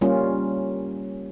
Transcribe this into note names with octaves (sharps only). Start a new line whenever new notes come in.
G3 A#3 C#4 F4